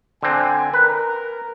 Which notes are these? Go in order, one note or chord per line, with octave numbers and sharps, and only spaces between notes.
D3 C4 G#5
A#4 B4